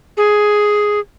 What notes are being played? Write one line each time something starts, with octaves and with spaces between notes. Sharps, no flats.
G#4